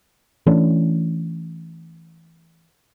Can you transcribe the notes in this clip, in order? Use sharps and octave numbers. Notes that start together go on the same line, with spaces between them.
E3 A3 C#4 D4